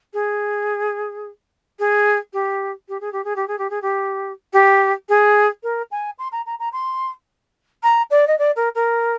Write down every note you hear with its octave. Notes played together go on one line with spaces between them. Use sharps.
G#4
G#4
G4
G4
G#4
G4
G#4
G4
G#4
G4
G#4
G4
G4
G#4
A#4
G#5
C6
A#5
A#5
A#5
C6
A#5
D5
D#5
D5
A#4
A#4